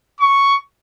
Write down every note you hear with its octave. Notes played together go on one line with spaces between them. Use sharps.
C#6